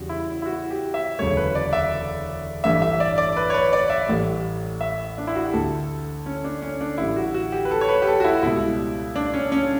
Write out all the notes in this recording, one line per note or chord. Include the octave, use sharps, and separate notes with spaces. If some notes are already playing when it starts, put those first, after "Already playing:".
Already playing: E2 C#3 G3 F#4
E4
E4
F#4
G4
E5
E1 D2 C#3 F#3 A3 C#5
B4
D5
E5
A1 G2 E3 A3 E5
E5
D5
D5
B4
C#5
B4
D5
E5
A1 A2 E3 G3
E5
D4
E4
F#4
G4
D2 D3 A3 A4
C#4
D4
C#4
D4
A1 A2 G3 E4
F#4
F#4
G4
B4
A4
C#5
B4
G4
A4
F#4
E4
C#2 B2 G3 E4
D4
C#4
C#4